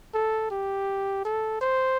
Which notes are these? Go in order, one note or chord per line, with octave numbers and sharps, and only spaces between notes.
A4
G4
A4
C5